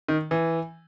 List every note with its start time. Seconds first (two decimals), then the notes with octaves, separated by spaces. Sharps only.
0.08 D#3
0.31 E3